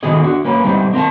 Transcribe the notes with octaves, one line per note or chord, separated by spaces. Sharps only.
D#3 A3 B3 F#4 G#4 D#5
D4 F#4
A#3 C#4 A#4 B4
G3 B3 C4 D#4 E4
C4 A#4 F5 A5